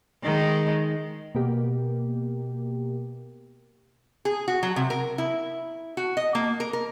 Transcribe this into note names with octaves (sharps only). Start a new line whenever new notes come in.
D#3 G#3 D#4
B2 A#3 G4
G#4
F#4
F#3
C3
A#4
E4
F#4
D#5
A#3
A#4
A#4